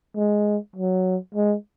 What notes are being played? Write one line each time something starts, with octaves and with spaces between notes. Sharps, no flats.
G#3
F#3
G#3